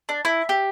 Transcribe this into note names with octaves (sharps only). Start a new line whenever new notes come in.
D4
E4
G4